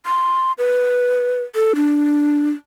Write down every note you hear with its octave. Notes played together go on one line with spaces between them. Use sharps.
C6
B4
A4
D4